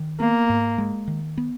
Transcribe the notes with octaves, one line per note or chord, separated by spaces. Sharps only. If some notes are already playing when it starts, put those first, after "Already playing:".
Already playing: D#3
A#3 B3
G#2
G#3
D#3
B3